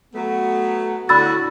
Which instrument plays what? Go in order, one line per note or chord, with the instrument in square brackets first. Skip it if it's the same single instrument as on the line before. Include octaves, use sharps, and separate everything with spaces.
[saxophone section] F#3 A3 B3
[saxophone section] A2 D3 F#4 [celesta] B5 E6 A6